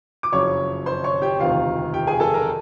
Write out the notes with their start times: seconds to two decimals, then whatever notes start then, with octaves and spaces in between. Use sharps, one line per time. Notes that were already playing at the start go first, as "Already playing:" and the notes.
0.23 D6
0.32 F#1 F2 C#3 F#3 C#5 C#6
0.86 C5 C6
1.04 C#5 C#6
1.22 G4 G5
1.40 E1 D2 C3 D#3 F4 F5
1.94 G4 G5
2.07 G#4 G#5
2.20 A4 A5
2.34 A#4 A#5